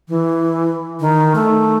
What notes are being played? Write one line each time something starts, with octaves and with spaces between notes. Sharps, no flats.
E3
D#3
A3